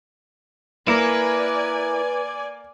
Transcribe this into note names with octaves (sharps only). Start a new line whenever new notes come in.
A#3 E4 A#4 B4 D5 G#5